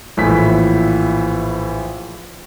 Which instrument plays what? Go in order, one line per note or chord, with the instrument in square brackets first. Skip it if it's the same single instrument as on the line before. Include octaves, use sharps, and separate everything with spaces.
[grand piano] A#1 G#5 B6 [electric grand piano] A2 E3 E4